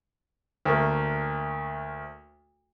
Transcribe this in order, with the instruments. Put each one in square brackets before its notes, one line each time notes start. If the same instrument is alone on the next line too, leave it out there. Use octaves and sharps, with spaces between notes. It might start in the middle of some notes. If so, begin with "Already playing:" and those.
[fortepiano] D2 A3 A#3